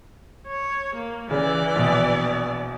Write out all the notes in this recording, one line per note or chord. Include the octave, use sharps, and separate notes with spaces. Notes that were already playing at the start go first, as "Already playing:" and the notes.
C#5
A#3
C#3 E3 D5
A#1 B2